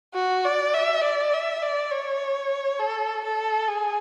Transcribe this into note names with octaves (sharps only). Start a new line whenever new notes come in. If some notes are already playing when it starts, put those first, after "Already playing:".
F#4
D5
E5
D5
E5
D5
C#5
A4
A4
G#4